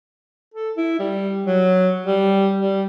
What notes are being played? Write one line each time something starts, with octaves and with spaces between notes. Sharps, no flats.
A4
E4
G3
F#3
G3
G3